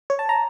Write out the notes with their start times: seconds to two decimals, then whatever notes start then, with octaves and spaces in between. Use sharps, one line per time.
0.10 C#5
0.19 A5
0.29 A#5